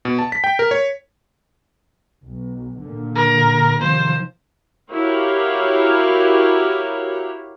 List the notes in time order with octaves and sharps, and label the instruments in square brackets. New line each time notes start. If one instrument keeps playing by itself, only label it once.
[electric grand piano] B2
A5
B6
G5
A#4
C#5
[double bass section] B1
A#2 D3
[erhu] A#4
[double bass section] C3 D#3 F3 [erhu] C5
[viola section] E4 F#4 G4 A#4 C#5 F5